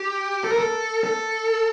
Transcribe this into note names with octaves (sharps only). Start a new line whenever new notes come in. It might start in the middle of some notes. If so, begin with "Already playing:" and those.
Already playing: G4
A4
A#4
A4
A4